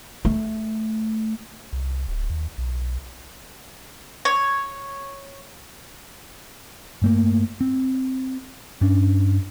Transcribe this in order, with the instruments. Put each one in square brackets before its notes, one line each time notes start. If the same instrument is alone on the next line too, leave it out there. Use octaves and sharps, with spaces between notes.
[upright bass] A3
[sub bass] C2
D1
D#2
B1
[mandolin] C#5
[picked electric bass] G2 A3 A#3
C4
G2 C#4 D4